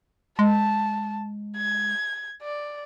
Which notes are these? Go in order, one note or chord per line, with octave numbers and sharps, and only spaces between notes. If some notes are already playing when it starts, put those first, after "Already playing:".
G#3 A5
G#6
D5